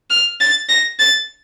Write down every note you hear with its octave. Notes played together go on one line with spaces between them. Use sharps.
F6
A6
A#6
A6